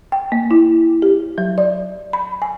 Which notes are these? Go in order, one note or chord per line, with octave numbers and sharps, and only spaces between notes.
G5
A#3
E4
G4
F#3
D5
B5
G#5